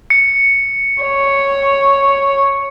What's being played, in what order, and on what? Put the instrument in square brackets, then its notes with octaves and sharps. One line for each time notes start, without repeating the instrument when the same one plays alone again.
[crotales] C#7
[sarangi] C#5